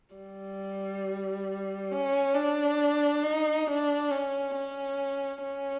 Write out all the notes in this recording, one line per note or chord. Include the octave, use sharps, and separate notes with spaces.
G3
C#4
D4
D#4
D4
C#4
C#4
C#4